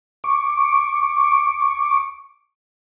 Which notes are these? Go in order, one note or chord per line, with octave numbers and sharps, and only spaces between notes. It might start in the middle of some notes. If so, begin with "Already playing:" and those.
C#6 D6